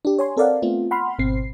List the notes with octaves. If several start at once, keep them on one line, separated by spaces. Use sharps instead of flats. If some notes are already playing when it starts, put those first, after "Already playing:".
D4 G4
C#5 G#5 C6
C4 A4 A#4 D5 F5 F#5
A3 B3 C4 F4
F#5 B5 C6 F6
G#1 B2 C4 C7